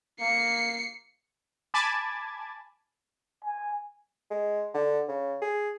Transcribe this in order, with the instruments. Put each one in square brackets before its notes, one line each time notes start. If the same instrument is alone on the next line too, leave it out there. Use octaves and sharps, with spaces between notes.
[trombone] A#3 [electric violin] C7 C#7
[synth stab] G#5 A5 B5 D6 G#6 A6
[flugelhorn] G#5
[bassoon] G#3
D3
C#3
G#4